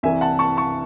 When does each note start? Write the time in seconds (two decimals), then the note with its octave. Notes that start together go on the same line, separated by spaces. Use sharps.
0.03 C2 C3 E3 E5 G#5
0.21 F#5 A5
0.39 A5 C#6
0.57 A5 C#6